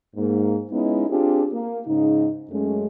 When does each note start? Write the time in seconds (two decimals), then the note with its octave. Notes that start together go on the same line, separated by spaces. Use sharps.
0.16 G#2 A#3
0.70 G#3 B3 C#4 D#4 E4
1.09 C4 D4 F4 G4 G#4
1.51 A#3
1.85 G#2 C#3 D#4
2.50 F#2 G#3 A3 C#4